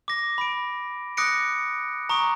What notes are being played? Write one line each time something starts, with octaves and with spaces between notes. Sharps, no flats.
D6 A#6
B5 D7
D6 D#6 F#6 A#6 C#7 D7
A#5 C#6 D#6 D7